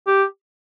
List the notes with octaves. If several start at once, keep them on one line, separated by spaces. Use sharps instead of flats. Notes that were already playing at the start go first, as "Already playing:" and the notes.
G4